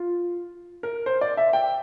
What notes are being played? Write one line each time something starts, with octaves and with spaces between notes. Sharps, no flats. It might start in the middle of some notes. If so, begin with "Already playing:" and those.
Already playing: F4
A#4
C5
D5
E5
G5